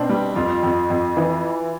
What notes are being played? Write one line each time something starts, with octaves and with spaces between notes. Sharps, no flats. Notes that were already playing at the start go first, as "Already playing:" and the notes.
Already playing: B2 C4 D4
G3
F2 F4
F2
F2
E3